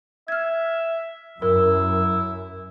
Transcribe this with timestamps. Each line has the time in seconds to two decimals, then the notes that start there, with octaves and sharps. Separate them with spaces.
0.28 E5 F6 G#6
1.42 F#2 E4 A#4